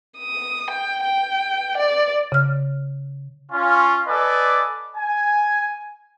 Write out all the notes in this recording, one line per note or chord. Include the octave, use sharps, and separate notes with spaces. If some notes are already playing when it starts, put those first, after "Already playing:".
D#6
G5
G5
D5
C#3 F6
C#4 F4
A4 B4 D5 D#5 G#5
G#5